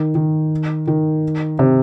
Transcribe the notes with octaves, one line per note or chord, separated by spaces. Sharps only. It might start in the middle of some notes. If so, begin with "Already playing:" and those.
Already playing: D#3
D#3
D#3
C3